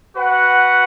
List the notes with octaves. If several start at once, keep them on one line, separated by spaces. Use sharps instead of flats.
F#4 B4 F#5